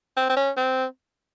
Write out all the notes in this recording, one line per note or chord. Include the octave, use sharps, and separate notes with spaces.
C4
C4
C#4
C4